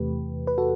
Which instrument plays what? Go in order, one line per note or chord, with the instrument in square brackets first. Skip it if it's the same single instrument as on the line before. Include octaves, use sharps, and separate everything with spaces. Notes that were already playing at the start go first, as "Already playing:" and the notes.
Already playing: [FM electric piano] E2 C3 E3 A3 G4 B4
B4
F#4 A4